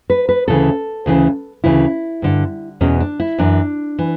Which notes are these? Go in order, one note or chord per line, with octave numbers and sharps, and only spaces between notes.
B4
B4
D2 C#3 E3 A4
D2 C#3 E3
D2 C#3 E3 E4
G2 D3
E2 B2 C#4
D4
E4
F#2 E3 D4
E3